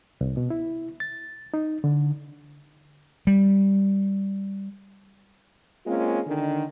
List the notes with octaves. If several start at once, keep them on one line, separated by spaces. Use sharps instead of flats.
C2
B2
E4
A6
D#4
D3
G3
G#3 A#3 C4 C#4 F4
D3 D#3 D4